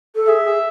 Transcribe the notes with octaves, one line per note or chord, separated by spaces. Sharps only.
A4
G#4 E5
G#4